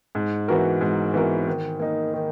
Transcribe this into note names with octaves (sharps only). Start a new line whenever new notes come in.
G#2
E3 B3 F#4 A#4
G#2
E3 B3 F#4 A#4
D#3
A#3 D#4
D#3